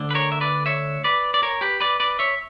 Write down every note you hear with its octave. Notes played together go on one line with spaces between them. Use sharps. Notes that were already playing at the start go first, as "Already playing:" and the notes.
Already playing: D2 D3
B4
A#4 C#5
E5
B4 D5
C#5 E5
B4 D5
D5
A#4 C#5
G4 B4
B4 D5
B4 D5
C#5 E5